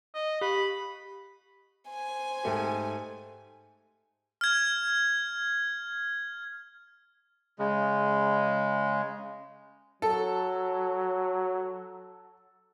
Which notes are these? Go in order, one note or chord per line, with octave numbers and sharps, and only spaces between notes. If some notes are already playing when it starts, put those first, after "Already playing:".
D#5
G4 B5
C5 G#5
G#2 A3 G4
F6 G#6
C#3 G#3
F#3 A4